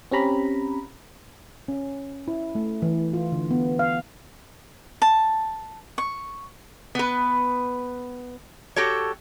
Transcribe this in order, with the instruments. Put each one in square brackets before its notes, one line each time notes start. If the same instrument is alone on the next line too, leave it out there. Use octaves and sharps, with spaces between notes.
[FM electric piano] C4 C#4 G4 A#5 B5
[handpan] C#4
E4
A3
E3
F4
D3
B3
F5
[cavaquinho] A5
C#6
[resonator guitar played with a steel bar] B3 B4
F#4 G4 A4 C#5